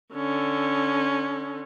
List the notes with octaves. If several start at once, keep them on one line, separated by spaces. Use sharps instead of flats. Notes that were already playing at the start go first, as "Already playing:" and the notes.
D3 C#4